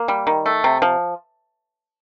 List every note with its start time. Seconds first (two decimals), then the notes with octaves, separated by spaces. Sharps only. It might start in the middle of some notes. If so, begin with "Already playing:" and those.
Already playing: A#3
0.08 G3
0.27 D#3
0.46 A3
0.64 C3
0.82 F3